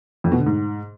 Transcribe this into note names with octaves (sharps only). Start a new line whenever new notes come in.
F2
B2
D3
G#2